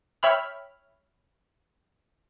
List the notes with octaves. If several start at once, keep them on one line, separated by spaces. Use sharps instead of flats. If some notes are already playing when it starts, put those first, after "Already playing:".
C#5 E5 G5 B5 F6